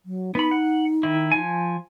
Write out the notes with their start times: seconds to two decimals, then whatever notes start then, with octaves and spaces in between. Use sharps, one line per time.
0.05 F#3
0.35 B3 D#4 B5
0.51 F#5
1.03 D#3 E4
1.32 F3 G#5